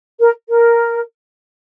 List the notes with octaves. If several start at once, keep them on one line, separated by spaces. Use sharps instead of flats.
A#4
A#4